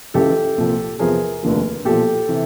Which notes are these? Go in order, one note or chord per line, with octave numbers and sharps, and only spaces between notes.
C#2 C#3 E3 G4 A4
C2 A#2 F3
E2 C3 F3 G#4 A#4
F1 D#2 D3 F3
B1 A#2 F3 G4 A4
C3 E3